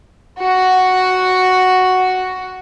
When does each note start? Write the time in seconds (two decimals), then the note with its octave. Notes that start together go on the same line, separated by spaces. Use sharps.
0.39 F#4 F#5